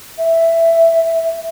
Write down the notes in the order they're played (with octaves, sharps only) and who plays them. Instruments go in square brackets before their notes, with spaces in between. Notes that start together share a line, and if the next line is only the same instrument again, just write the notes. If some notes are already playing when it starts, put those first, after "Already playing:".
[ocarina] E5